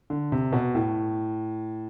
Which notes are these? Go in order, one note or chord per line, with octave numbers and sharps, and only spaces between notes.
D3
C3
B2
A2